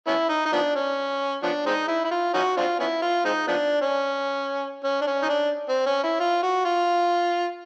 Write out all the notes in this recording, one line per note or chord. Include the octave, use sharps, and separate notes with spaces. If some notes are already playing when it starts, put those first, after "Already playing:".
B3 C#4 E4
D#4
D#4
F3 B3 D4
C#4
F3 B3 D4
G#3 C4 D#4
E4
E4
F4
C#4 D#4 F#4
C4 D4 F4
B3 C#4 E4
F4
G#3 C4 D#4
F3 B3 D4
C#4
C#4
D4
C#4
D#4
D4
C4
C#4
E4
F4
F#4
F4